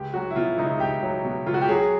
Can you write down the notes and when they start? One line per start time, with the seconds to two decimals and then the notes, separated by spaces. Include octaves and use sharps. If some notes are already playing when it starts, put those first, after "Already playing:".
Already playing: C#2 G4
0.14 F#3 F#4
0.30 E4
0.36 B2 F4
0.58 C#2 D#4
0.80 C#2 G4
1.03 F#3
1.24 B2
1.46 C#2 F4
1.54 F#4
1.61 G4
1.69 F#3 G#4